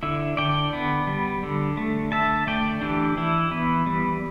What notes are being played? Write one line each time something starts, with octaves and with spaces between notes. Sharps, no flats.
D3 E4
D3 D5 G5
B3
G3
D3
A3
D3 E5 A5
A3 D5 G5
E3 D4 G4
E3 E4
B3
G3